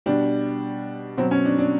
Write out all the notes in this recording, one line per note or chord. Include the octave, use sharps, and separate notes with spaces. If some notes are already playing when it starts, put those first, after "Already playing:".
B2 G3 D4
B2 F#3 C4
C#4
D4
D4